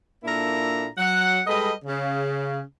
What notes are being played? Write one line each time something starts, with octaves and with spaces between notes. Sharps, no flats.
A#2 A#3 D4 E4 A4 A#5
F#3 F#5
G3 G#3 A4 B4 D#5
C#3